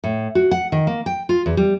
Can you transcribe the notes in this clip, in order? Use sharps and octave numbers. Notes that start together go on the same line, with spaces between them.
A2
F#4
F#5
D#3
A#3
G5
F4
E2
G3